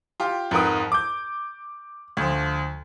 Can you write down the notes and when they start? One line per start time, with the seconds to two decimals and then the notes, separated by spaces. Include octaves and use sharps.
0.20 F4 G4
0.51 F2 G#2 A#4 B4 D#6
0.92 D6 G6
2.17 D2 F3